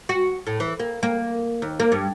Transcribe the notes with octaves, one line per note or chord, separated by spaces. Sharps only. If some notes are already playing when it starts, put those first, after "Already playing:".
F#4
A2
E3
A#3
A#3
D#2
A#3
G2